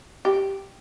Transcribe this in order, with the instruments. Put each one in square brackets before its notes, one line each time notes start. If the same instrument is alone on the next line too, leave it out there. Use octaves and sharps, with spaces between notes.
[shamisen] G4